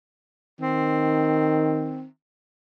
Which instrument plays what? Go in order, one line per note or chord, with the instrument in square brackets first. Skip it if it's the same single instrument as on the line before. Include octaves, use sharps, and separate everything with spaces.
[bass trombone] D#3 [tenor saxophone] C4